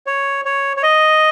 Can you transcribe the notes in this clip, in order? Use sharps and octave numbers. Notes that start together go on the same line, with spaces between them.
C#5
C#5
C#5
D#5